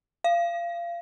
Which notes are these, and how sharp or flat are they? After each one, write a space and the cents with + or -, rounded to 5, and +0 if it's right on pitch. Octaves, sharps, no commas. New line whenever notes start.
F5 -25